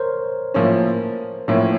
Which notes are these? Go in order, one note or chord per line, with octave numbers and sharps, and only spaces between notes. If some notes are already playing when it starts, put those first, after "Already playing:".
Already playing: A#4 C5 C#5
A2 F3 A#3 C#4
A2 F3 A#3 C#4